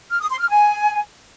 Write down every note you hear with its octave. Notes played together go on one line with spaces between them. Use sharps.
F6
D#6
C6
F6
G#5